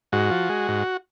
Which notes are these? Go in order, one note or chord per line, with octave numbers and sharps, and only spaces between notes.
G#2 F#4
F3
G#3
G#2